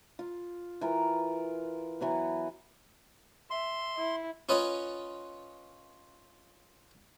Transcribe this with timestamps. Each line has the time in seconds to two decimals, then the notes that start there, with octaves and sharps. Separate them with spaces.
0.19 F4
0.81 E3 F4 A#4
2.00 E3 F#3 B3
3.50 E5 C6
3.97 E4
4.49 C#4 F4 B4 C#5 D#5